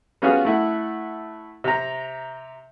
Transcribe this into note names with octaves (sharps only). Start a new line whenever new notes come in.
G3 B3 C#4 F4 F#4 G#4
A3 E4 F#5
C3 A#5